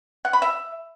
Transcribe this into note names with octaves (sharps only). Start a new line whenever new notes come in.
F#5
B5
E5